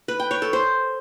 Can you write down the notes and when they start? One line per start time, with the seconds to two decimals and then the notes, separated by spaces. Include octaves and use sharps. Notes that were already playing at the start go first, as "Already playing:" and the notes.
0.08 B4
0.20 G5
0.31 C#5
0.42 A4
0.53 C5